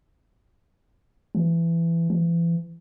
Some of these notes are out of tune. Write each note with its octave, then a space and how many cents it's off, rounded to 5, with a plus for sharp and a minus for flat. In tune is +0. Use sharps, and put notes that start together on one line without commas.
E3 +20
E3 +35